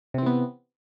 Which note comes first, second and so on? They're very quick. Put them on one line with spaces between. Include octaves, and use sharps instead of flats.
C3 C4 E3 B3